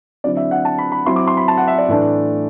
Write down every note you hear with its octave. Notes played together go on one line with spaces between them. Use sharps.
D3 F#3 C4 E4 D5
E5
F#5
A5
B5
B5
F#3 C4 E4 C6
D6
C6
B5
A5
F#5
E5
D5
A2 E3 A3 D4